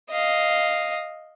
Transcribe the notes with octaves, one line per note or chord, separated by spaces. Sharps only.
D#5 F5